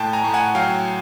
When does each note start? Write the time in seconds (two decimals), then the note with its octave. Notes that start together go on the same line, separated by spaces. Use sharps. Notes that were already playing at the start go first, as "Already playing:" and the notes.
Already playing: A2 G5 A5
0.13 G#5 A#5
0.24 A2
0.34 F#5 G#5
0.55 F#3 F5 G5